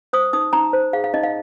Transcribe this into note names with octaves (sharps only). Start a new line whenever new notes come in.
C5 D#6
D#4 D#6
D#4 A#5
C5
G#4 F5
F5
D#4 D#5
F5